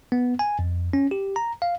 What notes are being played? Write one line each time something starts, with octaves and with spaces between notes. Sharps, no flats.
B3
G#5
F2
C#4
G4
A#5
F5